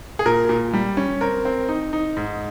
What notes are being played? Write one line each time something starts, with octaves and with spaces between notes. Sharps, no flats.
G#4
A#2 A#4
A#2
G3
C#4
C4 A#4
C4
D#4
D#4
G#2